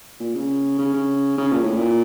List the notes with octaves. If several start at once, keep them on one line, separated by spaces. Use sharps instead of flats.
A#2
C#3
C#3
C#3
C#3
A#2
A2
A#2